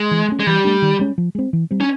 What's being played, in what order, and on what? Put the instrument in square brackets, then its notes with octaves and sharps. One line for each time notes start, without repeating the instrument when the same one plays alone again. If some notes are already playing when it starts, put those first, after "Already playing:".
Already playing: [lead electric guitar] G#3
[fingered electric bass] E3
A3 C#4
[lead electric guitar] G#3
[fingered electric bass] E3 [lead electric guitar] G3
[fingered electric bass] A3 D4
D#3
G#3 C#4
F3
G#3 C4
E3
G3 C4
[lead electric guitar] C#4